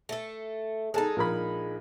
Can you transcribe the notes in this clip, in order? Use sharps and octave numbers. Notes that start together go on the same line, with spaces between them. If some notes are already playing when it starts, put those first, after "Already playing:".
A3 A4
G#3 D#4 A4 A5
A#1 A#4 B5